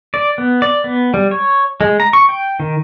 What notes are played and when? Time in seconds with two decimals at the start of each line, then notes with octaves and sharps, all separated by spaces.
0.14 D5
0.38 B3
0.62 D5
0.84 B3
1.14 G3
1.31 C#5
1.81 G#3
2.00 A#5
2.13 C#6
2.29 G5
2.60 D#3